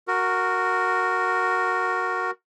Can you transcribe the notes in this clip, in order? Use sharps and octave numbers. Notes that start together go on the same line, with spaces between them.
F#4 A#4